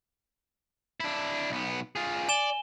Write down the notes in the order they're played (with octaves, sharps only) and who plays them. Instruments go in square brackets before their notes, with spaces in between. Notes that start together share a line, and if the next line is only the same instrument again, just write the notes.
[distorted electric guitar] D4 E4
B1 B3
F4 G#4
[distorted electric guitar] D5 [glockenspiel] G#5 E7 G7